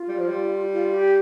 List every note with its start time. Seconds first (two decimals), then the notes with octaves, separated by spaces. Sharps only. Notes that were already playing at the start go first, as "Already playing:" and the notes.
Already playing: F4
0.08 G3
0.19 F3
0.28 G3
0.72 F4
0.94 G4